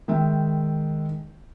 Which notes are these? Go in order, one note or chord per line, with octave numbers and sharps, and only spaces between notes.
D#3 G#3 E5 G5